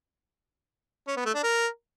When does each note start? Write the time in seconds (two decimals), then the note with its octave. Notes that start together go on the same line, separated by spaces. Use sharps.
1.08 C#4
1.16 B3
1.25 A3
1.34 D4
1.43 A#4